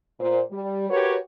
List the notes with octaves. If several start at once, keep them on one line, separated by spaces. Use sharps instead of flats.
A#2 C5
G3
F#4 G4 A#4 B4 C#5